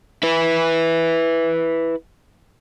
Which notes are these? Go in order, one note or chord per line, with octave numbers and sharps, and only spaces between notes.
E4 B4